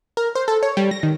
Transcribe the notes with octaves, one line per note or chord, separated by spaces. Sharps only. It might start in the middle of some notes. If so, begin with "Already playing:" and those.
A#4
C5
A4
C#5
G3
A#6
D#3